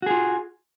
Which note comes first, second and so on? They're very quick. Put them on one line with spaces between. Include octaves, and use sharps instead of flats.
F#4 G#4 F4